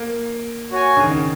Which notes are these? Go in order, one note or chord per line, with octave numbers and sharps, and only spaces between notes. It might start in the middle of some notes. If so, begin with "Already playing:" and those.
Already playing: A#3
F#4 C#5 G#5
C#3
D#3
C#3